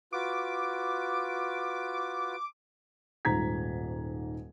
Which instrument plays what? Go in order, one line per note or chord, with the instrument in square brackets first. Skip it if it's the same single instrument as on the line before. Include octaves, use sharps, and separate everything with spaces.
[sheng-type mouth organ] F4 F#4 B4 [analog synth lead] D6
[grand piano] D#1 G#2 A#5 G#6 B6